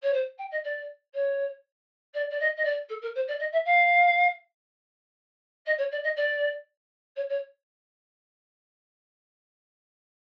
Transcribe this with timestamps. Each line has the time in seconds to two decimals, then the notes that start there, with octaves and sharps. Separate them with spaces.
0.02 C#5
0.13 C5
0.38 G5
0.50 D#5
0.64 D5
1.14 C#5
2.14 D5
2.30 D5
2.39 D#5
2.56 D#5
2.64 D5
2.89 A4
3.01 A#4
3.15 C5
3.27 D5
3.39 D#5
3.51 E5
3.65 F5
5.65 D#5
5.78 C#5
5.91 D5
6.03 D#5
6.16 D5
7.16 C#5
7.29 C#5